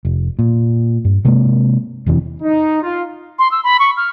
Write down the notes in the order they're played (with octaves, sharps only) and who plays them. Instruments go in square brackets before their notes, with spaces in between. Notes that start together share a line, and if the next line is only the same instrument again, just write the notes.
[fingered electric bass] F1
A#2
G2
C3 G#3 A#3
F1 E2 C3 E3
[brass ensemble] D#4
F4
[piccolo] C6
E6
B5
C#6
F6